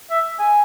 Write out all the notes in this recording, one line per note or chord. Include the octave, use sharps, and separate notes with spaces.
E5
G#5